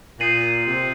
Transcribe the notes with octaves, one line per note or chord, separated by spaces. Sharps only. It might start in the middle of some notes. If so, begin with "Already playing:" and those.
A#2 D#6 G6 C7 D#7 F#7
C3